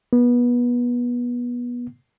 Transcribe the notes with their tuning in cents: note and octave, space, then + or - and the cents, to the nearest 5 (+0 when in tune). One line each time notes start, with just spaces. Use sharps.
B3 -25